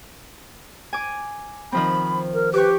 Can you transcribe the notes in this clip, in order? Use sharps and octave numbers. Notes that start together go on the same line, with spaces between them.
G#5 D6
D#3 F3 C4 B5
A#4
G4 B4 C#6 D6